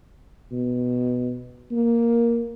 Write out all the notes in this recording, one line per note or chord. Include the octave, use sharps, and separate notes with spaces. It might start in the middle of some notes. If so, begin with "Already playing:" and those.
B2
A#3